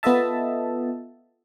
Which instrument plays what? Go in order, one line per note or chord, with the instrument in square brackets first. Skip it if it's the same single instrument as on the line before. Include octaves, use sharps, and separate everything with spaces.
[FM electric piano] B3 F4 A4 D#5 E5 A5